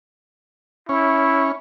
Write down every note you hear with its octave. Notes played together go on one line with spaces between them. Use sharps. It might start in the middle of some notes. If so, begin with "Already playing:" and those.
C#4 E4